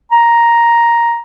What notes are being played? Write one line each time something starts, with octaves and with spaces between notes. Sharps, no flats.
A#5